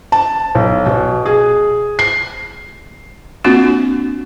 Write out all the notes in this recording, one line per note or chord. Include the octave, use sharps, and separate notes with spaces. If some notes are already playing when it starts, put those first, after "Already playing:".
A5
B1
B2
G#4
C7
A#3 C4 D4 F4 F#4